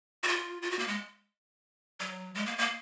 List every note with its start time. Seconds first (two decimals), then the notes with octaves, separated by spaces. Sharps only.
0.23 F#4
0.28 F4
0.62 F4
0.71 F#4
0.79 A#3
0.88 G#3
2.00 F#3
2.35 G#3
2.46 A#3
2.58 A#3